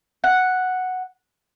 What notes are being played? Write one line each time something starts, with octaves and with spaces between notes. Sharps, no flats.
F#5